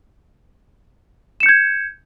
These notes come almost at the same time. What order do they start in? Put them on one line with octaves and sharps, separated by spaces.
E7 C#7 G6 G#6